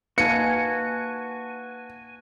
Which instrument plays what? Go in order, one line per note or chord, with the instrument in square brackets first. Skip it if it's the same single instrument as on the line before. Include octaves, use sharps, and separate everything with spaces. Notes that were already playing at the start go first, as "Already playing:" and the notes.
[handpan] A#3 D#4 F5 [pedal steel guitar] F#4 G#5 [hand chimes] B4 A5 [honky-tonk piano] C#7